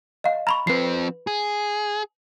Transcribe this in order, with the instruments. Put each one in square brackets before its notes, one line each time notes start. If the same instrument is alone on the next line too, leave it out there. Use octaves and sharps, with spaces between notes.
[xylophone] D#5 F5
A#5 B5 C#6
[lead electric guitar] F3 C4 [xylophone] B4 C7
[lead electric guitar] G#4